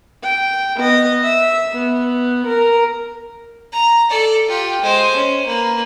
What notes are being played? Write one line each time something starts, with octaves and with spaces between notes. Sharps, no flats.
G5
B3 D#5
E5
B3
A#4
A#5
A4 D5
F4 G4
G#3 C5
C#4
A#3 B4